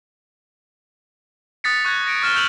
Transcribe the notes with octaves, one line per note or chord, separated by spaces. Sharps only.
D#6 F#6 A6 B6 C#7
C#6 F#6 G#6 A#6
A#6 C#7 D7
C#6 D#6 F6 A6 E7
C#6 E6 G6 F7 F#7